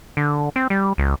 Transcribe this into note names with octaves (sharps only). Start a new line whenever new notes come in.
D3
C4
G3
C#2